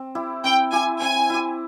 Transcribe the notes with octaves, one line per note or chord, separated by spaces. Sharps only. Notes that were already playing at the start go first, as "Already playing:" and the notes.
Already playing: C4
E4 G4
C4 G5
E4 G4 G#5
C4 G#5
E4 G4